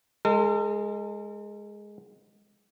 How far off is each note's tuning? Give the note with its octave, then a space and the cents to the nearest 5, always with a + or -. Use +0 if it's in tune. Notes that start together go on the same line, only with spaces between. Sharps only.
G#3 +0 A#4 -45